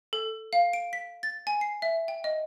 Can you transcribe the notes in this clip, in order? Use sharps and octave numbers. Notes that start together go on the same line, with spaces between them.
A4
F5
D7
B6
A6
G#5
C7
E5
G5
D#5